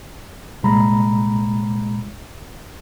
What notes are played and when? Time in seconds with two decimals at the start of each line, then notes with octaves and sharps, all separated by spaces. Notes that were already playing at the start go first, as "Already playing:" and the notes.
0.63 C2 A#2 G#3 A#5 B5